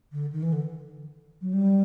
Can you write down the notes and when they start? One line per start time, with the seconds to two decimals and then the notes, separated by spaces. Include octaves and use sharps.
0.12 D3
0.33 D#3
0.42 E3
0.53 D3
1.41 F#3
1.53 G3